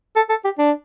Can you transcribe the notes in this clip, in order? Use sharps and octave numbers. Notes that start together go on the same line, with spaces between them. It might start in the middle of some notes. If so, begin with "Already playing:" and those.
A4
A4
G4
D4